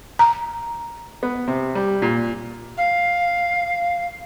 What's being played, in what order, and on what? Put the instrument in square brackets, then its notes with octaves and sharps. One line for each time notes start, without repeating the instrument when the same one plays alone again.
[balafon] A#5
[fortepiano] B3
C3
G3
A#2
[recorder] F5